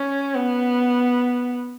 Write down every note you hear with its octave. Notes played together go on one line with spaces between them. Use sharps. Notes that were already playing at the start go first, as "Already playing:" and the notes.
Already playing: C#4
B3